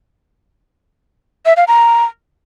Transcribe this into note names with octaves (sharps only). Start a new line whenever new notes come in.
E5
F5
A#5